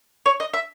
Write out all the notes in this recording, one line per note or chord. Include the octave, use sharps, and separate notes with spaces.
C#5
D#5
E5